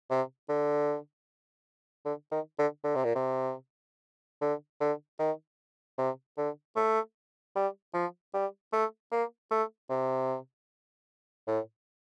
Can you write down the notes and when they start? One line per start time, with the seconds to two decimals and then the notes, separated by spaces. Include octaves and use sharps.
0.10 C3
0.49 D3
2.05 D3
2.31 D#3
2.59 D3
2.84 D3
2.95 C3
3.04 A#2
3.15 C3
4.41 D3
4.80 D3
5.19 D#3
5.98 C3
6.37 D3
6.76 A3
7.55 G3
7.94 F3
8.34 G3
8.73 A3
9.11 A#3
9.51 A3
9.89 C3
11.47 A2